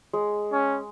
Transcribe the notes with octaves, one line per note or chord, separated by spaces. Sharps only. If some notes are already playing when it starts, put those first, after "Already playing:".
G#3
C#4